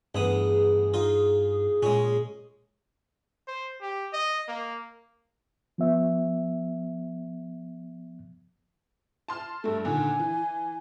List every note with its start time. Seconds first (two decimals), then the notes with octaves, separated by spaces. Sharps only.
0.15 A1 G2 B3 G#4 D#6
0.94 D#4 F4
1.83 A#2 G#3 C#4
3.48 C5
3.81 G4
4.13 D#5
4.48 A#3
5.78 F3 B3 E5
9.28 A5 C6 F6
9.64 G2 A3 A4
9.85 A#2 D3 D#3 G#5
10.20 E3